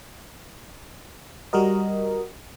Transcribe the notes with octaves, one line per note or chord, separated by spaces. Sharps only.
G3 F#4 A#4 D#5